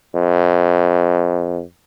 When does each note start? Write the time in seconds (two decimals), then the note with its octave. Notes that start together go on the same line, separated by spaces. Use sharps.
0.15 F2